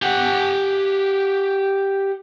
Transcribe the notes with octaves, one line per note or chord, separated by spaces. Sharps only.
G4 F#5